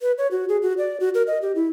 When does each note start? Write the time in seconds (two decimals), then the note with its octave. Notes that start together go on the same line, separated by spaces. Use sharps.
0.01 B4
0.18 C#5
0.31 F#4
0.49 G#4
0.62 F#4
0.78 D5
1.00 F#4
1.15 A#4
1.27 D#5
1.42 G4
1.55 E4